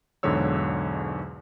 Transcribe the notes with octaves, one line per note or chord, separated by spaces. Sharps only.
B1 E2 G#2 D3 C#5 E6